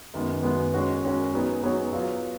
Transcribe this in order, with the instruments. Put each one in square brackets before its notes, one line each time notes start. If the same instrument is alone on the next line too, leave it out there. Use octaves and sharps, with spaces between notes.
[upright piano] F#2 D#3 G#3 B3
F#2 D#3 G#3 B3
G#3 C#4 F#4 A#4
G#3 C#4 F#4 A#4
F#3 B3 D#4 G#4 C#5
F#3 B3 D#4 G#4 C#5
F#3 B3 F4